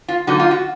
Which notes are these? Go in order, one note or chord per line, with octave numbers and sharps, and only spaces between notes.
F4
D3 F#3 A#3 D#4 F#4
F4
F#4